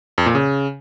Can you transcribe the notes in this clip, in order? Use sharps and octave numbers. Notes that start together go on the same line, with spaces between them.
F2
A#2
C#3